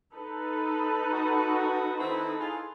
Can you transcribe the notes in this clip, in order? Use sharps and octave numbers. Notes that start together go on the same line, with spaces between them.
D#4 A4 B4
F#4
D#3 C4 E4
E4 F4 G#4